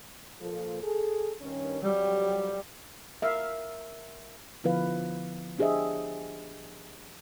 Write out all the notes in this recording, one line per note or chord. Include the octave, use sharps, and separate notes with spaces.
A#2 F3 A4
G#4 A4
G2 D#3 C#4
F2 F#3 G3 G4
A#4 E5 F5
D3 F3 B3 E4 B4 F5
D4 G4 G#4 C5 D#5 E5